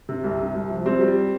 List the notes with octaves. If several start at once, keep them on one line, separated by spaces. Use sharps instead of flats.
C3
C2
C3
C2
F3
G3 C4
G3